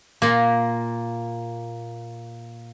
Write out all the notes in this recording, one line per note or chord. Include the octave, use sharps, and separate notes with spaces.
A#2 A#3